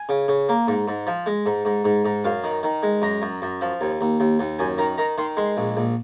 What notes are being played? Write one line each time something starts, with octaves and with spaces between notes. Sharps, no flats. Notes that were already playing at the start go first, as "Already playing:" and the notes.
Already playing: G#5
C#3
C#3
A#3
G#2
G#2
F3
G#3
G#2
G#2
G#2
G#2
F#2 F5
D#3
D#3
G#3
F#2 A#5
F#2
F#2
F3
D#2
D#2
D#2
D#2
F#2 G#5
D#3 A#5
D#3 A#5
D#3 C6
G#3 C6
A#1
A#1